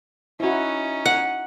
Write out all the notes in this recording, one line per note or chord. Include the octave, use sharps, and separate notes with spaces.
C#4 D#4 E4 F#4
F#5